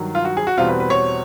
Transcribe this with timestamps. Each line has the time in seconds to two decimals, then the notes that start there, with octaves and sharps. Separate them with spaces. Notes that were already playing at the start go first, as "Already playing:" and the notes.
Already playing: G2 D#3 F#3
0.15 F4
0.25 F#4
0.37 G#4
0.47 F#4
0.57 E2 B2 G3 C4 F4
0.68 B4
0.80 B4
0.90 C#5